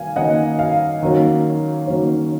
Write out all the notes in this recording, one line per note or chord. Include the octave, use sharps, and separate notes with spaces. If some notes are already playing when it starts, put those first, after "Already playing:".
Already playing: D#3 A#3 F5 G#5
D#3 A#3 C#4 D#5 F#5
F5
D#3 F#3 A#3 C#4
D#3 F#3 A#3 C#4